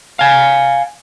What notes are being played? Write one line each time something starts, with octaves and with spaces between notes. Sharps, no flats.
F5 G#5